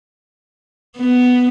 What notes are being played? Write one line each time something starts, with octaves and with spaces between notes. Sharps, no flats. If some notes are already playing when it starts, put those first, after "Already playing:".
B3